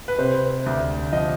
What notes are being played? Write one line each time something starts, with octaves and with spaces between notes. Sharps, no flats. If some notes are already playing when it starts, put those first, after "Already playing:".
B4
C3 C5
D2
F3 D#5